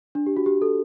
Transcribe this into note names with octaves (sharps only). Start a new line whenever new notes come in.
D4
G4
F#4
G4
A4